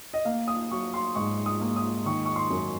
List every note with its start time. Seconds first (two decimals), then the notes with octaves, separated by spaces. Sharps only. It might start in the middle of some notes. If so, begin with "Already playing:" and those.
0.14 D#5
0.25 A#3 F5
0.48 D#6
0.71 F#3 C#6
0.94 C6
1.15 G#2 C#6
1.46 D#6
1.61 A#3
1.76 D#6
2.05 D#3 C#6
2.26 C#6
2.36 C6
2.50 F#2